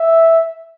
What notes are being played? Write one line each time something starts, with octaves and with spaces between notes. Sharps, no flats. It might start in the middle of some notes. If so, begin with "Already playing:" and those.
Already playing: E5